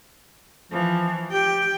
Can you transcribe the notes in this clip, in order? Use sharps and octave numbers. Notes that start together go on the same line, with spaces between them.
E3 F3
G4 G5